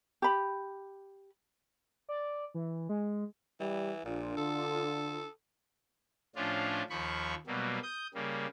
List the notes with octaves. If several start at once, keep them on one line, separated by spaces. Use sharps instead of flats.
G4 B5
D5
E3
G#3
E3 G3
A#1 A#2 D4 F4
D3 A4
A2 F3 C#4 D4 F4
D#2 F3 B5 C#6
B2 F#3 G3 A#3
D#6 G6
C#3 G3 A#3